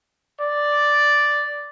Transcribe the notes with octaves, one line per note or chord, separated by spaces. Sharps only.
D5